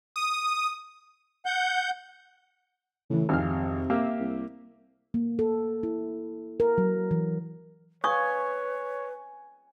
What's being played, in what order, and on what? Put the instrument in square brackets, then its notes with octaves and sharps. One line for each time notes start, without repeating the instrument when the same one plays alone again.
[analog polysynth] D#6
[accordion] F#5 G6
[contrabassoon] A2 [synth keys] C#3 E3
[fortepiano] G#1 F6 [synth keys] F2 F5 [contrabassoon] C3
[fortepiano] A#3 G4 F5 [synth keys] E5
[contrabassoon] C2
[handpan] A#3
A4
E4
A#4
F#3
E3
[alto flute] B4 [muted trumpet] C#5 [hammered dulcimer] G#5 [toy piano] C#6 D#6